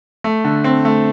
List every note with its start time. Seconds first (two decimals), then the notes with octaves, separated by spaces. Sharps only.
0.24 A3
0.44 D3
0.64 C4
0.85 A3